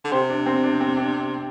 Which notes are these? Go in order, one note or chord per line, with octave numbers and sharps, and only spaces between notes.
D3
C3 G4 C5
D4
C4
D4
C4
D4